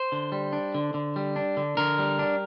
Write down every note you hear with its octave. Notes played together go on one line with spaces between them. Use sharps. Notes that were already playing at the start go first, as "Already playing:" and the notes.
Already playing: C5
D3
G3
D4
D3
D3
G3
D4
D3
D3 A#4
G3
D4